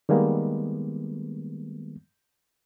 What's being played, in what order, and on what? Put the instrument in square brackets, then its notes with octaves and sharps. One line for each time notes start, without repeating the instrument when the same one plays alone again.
[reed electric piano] D#3 G3 G#3 A#3 B3